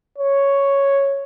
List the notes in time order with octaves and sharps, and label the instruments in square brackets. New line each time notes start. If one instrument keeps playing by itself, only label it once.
[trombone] C#5